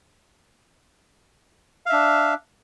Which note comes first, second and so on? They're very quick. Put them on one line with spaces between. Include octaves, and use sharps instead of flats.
F5 E5 D4